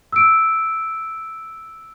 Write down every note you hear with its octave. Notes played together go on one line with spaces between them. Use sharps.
E6 D7